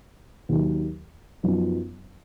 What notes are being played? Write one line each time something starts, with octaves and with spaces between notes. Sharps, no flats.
D#2 D#3 F#3
F#2 F3 B3 D#4